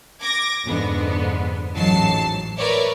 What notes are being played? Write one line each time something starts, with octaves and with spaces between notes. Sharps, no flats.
D6 G#6 A#6
F2 G#2 D3 B3
A1 G#2 F#3 A5 C7
A#4 B4 C#5 D5 E5